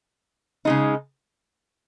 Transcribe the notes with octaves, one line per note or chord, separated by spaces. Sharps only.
C#3 G#3 D#4